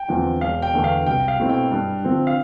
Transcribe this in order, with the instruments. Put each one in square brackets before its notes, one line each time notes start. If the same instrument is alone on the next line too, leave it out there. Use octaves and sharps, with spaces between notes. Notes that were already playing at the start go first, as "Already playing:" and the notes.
Already playing: [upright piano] G5
[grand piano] E2 D3 F3 C4
[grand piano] E1 [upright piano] F5
[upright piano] G5
[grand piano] E2 D3 A3
[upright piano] F5
[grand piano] C2 [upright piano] G5
[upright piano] F5
[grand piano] B2 A3 C4 E4
[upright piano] G5
[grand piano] G2
D3 F3 C4
[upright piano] F5